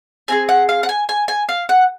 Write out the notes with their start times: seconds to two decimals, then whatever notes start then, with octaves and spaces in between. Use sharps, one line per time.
0.28 C4 F4 G#4 G#5
0.49 F#5
0.69 F5
0.83 F#5
0.89 G#5
1.09 G#5
1.28 G#5
1.49 F5
1.69 F#5